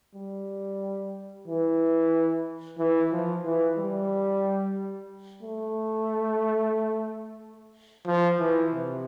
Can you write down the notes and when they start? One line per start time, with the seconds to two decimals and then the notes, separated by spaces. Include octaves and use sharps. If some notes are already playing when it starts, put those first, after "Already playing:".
0.15 G3
1.48 E3
2.78 E3
3.12 F3
3.45 E3
3.78 G3
5.43 A3
8.06 F3
8.39 E3
8.72 C3